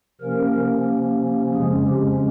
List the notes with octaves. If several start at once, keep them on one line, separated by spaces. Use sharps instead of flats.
C3 F3 A#3 C#4 A#4
F2 C#3 F3 G#3 C#4 G#4
G4